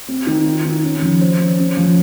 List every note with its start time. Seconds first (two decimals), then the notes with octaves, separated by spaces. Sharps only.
0.08 C4
0.27 D#3
0.45 F4
0.65 D#3
0.83 C#4
1.02 F3
1.21 C5
1.40 C#4
1.58 C#4
1.77 F3